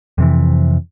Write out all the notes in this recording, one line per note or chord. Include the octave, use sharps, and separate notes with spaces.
F2 C3 E3